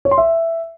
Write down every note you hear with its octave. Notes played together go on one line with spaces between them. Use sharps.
C#5
C6
E5